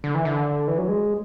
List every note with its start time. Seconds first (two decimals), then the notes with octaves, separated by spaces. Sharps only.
0.04 D3
0.14 E3
0.25 D3
0.68 E3
0.78 F#3
0.88 G#3